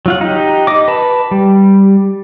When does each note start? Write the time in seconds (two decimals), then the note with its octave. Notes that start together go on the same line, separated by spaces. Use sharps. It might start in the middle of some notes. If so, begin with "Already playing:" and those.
0.06 F#3 F4 F#5
0.21 D#4 G4
0.67 D#5 D6
0.88 B4 A5
1.31 G3